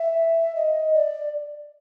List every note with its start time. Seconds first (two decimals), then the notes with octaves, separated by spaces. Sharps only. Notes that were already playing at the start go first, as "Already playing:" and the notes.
Already playing: E5
0.56 D#5
0.94 D5